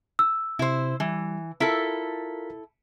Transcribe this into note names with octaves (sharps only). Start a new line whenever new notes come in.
E6
C3 E4 C5
E3 G3
E4 F4 A4 A#4 B6